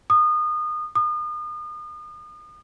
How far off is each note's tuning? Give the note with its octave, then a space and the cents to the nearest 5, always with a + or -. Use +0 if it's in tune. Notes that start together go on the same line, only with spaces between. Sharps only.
D#6 -25
D#6 -35